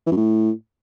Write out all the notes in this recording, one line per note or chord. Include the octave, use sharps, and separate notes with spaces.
E3
F#2
A2